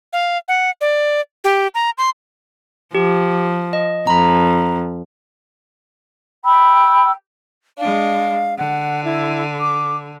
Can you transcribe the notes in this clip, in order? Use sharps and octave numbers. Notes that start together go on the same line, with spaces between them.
F5
F#5
D5
G4
A#5
C6
F3 G4
D#5
F2 A#5 B5
G5 B5 E6
G#3 D4 F5
D3 F#5
E4
D6